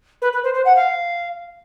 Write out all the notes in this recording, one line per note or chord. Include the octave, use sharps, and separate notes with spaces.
B4
B4
C5
C5
F#5
F5